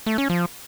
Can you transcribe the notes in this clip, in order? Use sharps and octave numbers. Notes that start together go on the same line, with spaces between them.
A3
C#4
F3